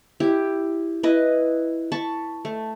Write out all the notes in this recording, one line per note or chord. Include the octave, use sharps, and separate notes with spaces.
E4 G4
E4 B4 D#5
A5 B5 C#6
A3